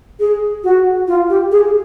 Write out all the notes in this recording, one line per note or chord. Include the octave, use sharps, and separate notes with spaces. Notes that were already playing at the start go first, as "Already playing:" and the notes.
G#4
F#4
F4
G4
G#4